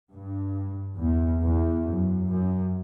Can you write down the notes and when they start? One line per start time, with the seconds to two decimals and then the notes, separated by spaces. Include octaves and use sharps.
0.11 G2
0.99 E2
1.43 E2
1.86 F#2
2.29 F#2